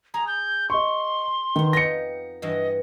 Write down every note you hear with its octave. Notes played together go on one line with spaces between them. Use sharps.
G#4 A#5
G6
D#5 C6 C#6
D#3 B3 F#5
F2 D#4 G5 A#6 C#7
G2 E3 F#4 D#5